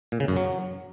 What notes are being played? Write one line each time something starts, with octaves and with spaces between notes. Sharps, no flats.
A#2
C#3
F#2
F#3